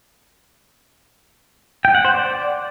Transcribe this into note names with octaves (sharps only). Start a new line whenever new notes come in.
G5
F#5
C5
D5